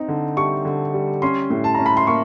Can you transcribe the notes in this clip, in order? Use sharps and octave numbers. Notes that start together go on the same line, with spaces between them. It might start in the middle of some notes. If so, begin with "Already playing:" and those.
Already playing: C4 D#4
D3
G3 C#6
D3
G3
C#4 C6
A2
A5
C#4 A#5
B5
C6
A#3 C#6